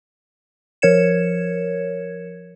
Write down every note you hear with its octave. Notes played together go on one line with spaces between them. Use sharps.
F3 A#4 C#5 G#6 C#7 E7